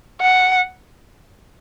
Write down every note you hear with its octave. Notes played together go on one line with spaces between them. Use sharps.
F#5